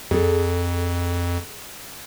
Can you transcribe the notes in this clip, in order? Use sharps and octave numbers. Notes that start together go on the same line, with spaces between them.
F2 G#4 A4